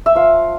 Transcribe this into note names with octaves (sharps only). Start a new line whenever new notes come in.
E5
F3 F5